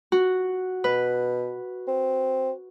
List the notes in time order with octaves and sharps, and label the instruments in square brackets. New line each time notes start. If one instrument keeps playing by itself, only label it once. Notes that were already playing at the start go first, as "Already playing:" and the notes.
[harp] F#4
[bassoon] B2 [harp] B4
[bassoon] C4